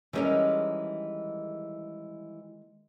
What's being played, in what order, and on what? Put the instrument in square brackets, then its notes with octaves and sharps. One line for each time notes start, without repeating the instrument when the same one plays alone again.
[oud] D#3 G#3 A#4 [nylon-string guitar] E3 G3 C#4